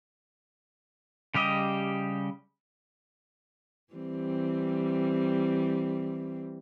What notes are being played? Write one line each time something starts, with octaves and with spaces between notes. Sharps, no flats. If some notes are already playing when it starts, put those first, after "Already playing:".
C#3 G3 G4 D#5
E3 G3 C4